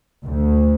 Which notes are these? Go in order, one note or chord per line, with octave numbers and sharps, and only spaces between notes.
D2